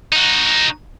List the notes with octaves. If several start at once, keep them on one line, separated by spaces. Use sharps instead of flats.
D#4 F#4